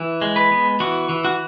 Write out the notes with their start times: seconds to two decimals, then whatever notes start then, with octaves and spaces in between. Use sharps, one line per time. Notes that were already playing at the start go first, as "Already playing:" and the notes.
Already playing: E3
0.22 G#3
0.36 B4
0.52 B3
0.80 E3 F#4
1.09 E3
1.25 F#4